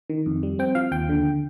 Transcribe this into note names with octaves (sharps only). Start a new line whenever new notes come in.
D#3
F2
G3
C4 G5
F3 F5
D#2 G5
D3